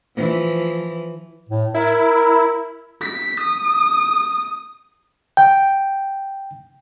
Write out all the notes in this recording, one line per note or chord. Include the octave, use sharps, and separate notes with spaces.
E3 F3
A2
E4 A#4
B6
D#6
G5